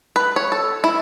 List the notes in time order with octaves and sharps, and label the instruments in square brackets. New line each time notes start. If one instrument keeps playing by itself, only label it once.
[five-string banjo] B4
C#5
A4
E4